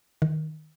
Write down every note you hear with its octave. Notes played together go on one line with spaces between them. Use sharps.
D#3